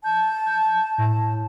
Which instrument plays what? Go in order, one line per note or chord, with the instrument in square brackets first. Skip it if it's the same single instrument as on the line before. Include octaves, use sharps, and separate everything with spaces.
[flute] A5 [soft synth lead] G6
[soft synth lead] G6
[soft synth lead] A2 [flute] A5